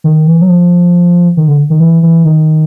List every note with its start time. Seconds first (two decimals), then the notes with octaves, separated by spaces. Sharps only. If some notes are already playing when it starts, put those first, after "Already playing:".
0.04 D#3
0.27 E3
0.42 F#3
0.49 F3
1.37 D#3
1.48 D3
1.70 D#3
1.80 E3
2.03 E3
2.25 D#3